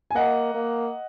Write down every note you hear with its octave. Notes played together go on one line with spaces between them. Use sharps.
G#5
A#3 D#5 F#5
A#3